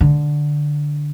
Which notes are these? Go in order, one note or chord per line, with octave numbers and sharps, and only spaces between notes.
D3